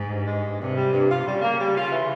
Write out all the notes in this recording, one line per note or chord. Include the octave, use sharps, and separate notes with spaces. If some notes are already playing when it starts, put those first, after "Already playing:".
Already playing: G#2
G2
G#3
G2
G2 C3
G3
G2
F4
C#3 G3
A#3
G3
F4
E3